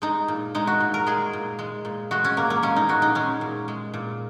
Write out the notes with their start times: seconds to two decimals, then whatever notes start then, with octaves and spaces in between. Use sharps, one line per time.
0.02 G#3 D#4
0.28 A#2
0.55 G#3 D#4
0.67 F#4
0.80 A#2
0.94 A#4
1.07 G#3 G#4
1.33 A#2
1.59 G#3
1.85 A#2
2.11 G#3 F#4
2.25 C#4
2.37 A#2 A#3
2.50 A#3
2.63 G#3 C#4
2.76 D#4
2.89 A#2 F#4
3.02 D#4
3.15 G#3 C#4
3.41 A#2
3.68 G#3
3.94 A#2